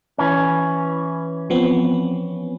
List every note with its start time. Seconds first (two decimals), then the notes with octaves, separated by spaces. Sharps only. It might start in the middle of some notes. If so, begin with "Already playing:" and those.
0.18 E3 C#4
1.50 F3 B3 C4